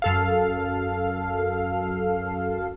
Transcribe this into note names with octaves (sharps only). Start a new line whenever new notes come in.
F#2 A4 F5